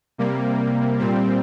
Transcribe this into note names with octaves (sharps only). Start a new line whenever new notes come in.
C3 G3 A#3
A#2 G3 C4